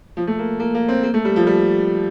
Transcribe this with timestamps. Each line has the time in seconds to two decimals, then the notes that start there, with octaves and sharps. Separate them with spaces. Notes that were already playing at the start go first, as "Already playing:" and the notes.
0.17 F3
0.27 A3
0.39 A#3
0.60 A#3
0.75 A#3
0.89 C4
1.03 A#3
1.14 A3
1.25 G3
1.36 F3
1.47 G3